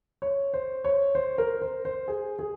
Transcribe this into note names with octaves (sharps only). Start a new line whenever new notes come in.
C#5
C5
C#5
C5
A#4
C5
C5
G#4
G#4